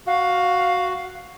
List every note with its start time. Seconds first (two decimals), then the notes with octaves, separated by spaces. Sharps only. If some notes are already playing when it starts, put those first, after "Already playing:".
0.07 F#4 F5